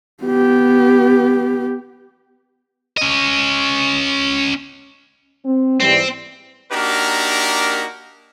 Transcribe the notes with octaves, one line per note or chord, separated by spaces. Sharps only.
B3 G4
C#4 D#5
C4
G#2 E3 G3 C4
A#3 D4 D#4 F#4 G4 A#4